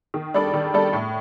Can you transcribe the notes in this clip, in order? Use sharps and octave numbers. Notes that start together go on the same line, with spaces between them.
D#3
G3 D4 A4 D5
D#3
G3 D4 A4 D5
A2